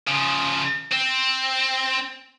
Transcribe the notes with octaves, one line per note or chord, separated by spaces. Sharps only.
C#3 F3
C4